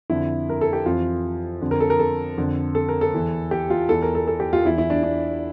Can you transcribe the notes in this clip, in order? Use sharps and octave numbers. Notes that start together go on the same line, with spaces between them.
F2 D3 E4
A#4
A4
G4
F2 E3 F4
F2 D3
A#4
A4
A#4
A4
F2 D3
A4
A#4
A4
E2 E3
G4
F4
E2 E3 A4
A#4
A4
A4
G4
F4
E2 E3 E4
E4
D4
D4